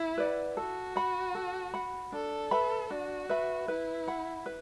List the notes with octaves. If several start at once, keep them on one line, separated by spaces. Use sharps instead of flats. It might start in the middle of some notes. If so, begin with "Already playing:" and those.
Already playing: E4
B4 D5 F#5
F#4 A4
F#5 B5
A4
F#5 B5
D4 A4
B4 E5 B5
D4 F#4
B4 E5 B5
E4 B4
F#5 B5
B4